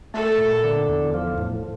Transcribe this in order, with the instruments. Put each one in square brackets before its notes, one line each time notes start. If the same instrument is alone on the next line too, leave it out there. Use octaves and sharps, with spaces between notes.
[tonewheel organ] A3 [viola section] A4
[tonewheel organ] A#2
D3
E2
F3
A2